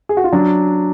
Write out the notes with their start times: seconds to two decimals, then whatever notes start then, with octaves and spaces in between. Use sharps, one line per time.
0.09 G#4
0.17 F#4
0.24 F4
0.32 F#3 D4